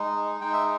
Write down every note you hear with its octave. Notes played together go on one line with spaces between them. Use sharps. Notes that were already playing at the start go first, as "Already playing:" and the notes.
Already playing: G#3 D#4
G#3 D#4 G5
E5